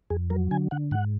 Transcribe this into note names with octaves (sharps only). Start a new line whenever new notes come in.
F2 G#4
F#3 A#4
D3 G#5
D3 F#5
G#2 F#5